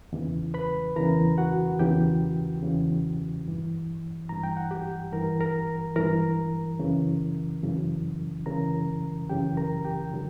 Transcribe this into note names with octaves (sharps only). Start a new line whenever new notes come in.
E2 C#3 E3
B4 B5
E2 C#3 E3 A#4 A#5
F#4 F#5
E2 C#3 E3 G4 G5
E2 C#3 E3
G2 E3
G2 E3 A#5
G5
F#5
G4 G5
G2 E3 A#4 A#5
A#4 A#5
G2 E3 A#4 A#5
F#2 C#3 E3
F#2 C#3 E3
F#2 C#3 E3 A#4 A#5
F#2 C#3 E3 G4 G5
A#4 A#5
G4 G5
D3 F#3